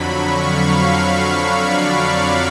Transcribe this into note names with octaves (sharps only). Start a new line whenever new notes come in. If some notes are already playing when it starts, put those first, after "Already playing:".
Already playing: F2 D3 F#3 B5 C#6
F5
D5